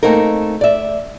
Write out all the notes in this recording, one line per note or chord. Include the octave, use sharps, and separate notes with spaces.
A3 A#3 C4 D#4 A#4
D5 E5